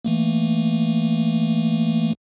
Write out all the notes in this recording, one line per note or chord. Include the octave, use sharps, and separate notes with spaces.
E3 A3 A#3